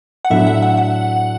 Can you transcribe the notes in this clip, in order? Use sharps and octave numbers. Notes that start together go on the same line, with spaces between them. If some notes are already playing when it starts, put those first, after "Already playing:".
F#5
A2 F#3 A3 D4 E5
F#5
F#5
F#5